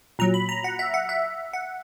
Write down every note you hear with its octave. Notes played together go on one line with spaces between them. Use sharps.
A#2 F#3 A#5
B5
A#5
F#5
E5
F#5
E5
F#5